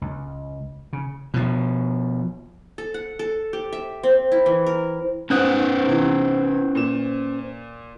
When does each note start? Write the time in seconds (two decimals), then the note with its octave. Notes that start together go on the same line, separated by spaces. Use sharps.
0.01 C#2
0.93 C#3
1.34 B2 F3
2.78 A4
2.94 F#5
3.19 A4
3.53 G4
3.73 E5
4.03 C4
4.32 E4
4.46 E3
4.66 A#4
5.30 G#2 C#4 B4 C5 D#6 F#6
5.85 C3 E3
6.75 A#2 E7